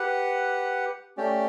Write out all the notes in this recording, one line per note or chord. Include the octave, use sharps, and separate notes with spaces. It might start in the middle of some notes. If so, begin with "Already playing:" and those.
Already playing: G4 B4 F#5
A3 C#4 G4 D5 G5